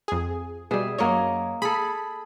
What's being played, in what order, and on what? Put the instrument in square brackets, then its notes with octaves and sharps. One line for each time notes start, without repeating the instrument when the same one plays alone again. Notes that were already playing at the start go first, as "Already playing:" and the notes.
[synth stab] F2 G#4
[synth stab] B2 G3 [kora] G#4 E5
[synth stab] F#2 F#3 C#5 [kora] A#3 D#5
[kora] G#4 A4 [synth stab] B5